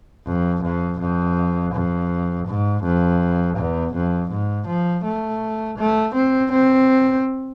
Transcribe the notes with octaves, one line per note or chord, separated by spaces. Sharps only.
F2
F2
F2
F2
G#2
F2
E2
F2
G#2
F3
A3
A3
C4
C4